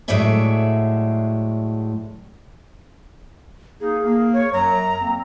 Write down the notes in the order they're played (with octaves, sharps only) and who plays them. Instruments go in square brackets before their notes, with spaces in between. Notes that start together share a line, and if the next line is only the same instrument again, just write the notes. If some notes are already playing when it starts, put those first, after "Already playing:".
[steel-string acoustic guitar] A2 F#3 G#3 D5 E5 G#5
[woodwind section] A#3 D#4 [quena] G#4
[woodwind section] A#3
[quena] C#5
[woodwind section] F#2 F#3 [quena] A#5
[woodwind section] F2 A#3 C4